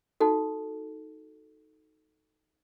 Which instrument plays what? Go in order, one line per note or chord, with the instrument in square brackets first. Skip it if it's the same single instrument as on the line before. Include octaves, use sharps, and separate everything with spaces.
[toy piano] D#4 F#4 A4